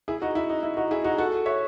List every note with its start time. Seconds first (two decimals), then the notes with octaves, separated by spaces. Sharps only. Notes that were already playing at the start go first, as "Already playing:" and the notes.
0.08 E4 G#4
0.22 D#4 F#4
0.35 E4
0.49 D#4
0.63 E4
0.77 D#4 F#4
0.91 E4 G#4
1.04 D#4 F#4
1.18 F#4 A4
1.46 C#5 E5